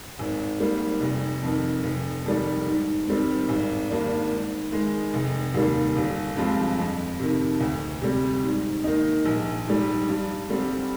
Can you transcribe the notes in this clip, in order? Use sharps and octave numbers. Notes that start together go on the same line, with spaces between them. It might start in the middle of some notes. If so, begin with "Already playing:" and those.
G#1
G#2 G3 A#3
F1
F2 D#3
F1
F2 D#3 G3 D4
G#2
D#3 G3 C4
G#1
G2 D#3 A#3 D4
G#2
D#3 G#3
F1
D#2 D#3 G3 A#3
G1
G2 F3 G#3 C4
F2
C3 D#3
D2
C3 G3
G#2
D#3 A#3 D#4
A#1
G#2 G3
G2
D3 G3 C4